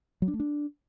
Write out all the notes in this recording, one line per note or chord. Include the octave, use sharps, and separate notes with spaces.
F#3
D4
A3
D4